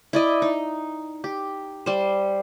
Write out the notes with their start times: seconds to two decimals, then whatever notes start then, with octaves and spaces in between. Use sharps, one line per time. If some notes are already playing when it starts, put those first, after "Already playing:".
0.13 E4 D5 D#5
0.42 D#4
1.24 G4
1.86 G3 C5